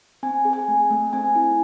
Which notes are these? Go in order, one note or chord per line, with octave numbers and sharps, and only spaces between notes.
C4 G#5
G#4
G#5
A3
A3
C4 G#5
E4